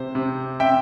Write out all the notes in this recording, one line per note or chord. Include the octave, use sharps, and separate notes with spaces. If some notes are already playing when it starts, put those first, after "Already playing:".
Already playing: C3 C5
C3
C3 E5 G5